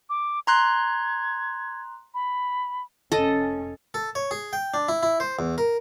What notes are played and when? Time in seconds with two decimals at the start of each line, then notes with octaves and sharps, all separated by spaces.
0.09 D6
0.47 A#5 C6 F#6 G#6
2.14 B5
3.12 F1 C#4 A4 D#5
3.94 A4
4.15 C#5
4.31 G#4
4.53 G5
4.74 D4
4.88 E4
5.03 E4
5.20 C5
5.39 E2
5.58 A#4